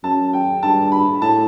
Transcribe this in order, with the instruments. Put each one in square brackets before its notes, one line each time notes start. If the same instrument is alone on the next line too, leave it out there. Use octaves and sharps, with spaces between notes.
[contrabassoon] F#2 [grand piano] A5
[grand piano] G5
[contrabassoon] G2 [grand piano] A5
[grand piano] B5
[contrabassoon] A2 [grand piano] A5